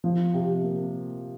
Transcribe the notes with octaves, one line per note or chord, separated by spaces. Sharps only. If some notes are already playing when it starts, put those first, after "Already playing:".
F3
C3
A#3